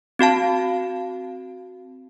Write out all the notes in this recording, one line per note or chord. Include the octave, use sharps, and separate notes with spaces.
C4 F#4 F5 A5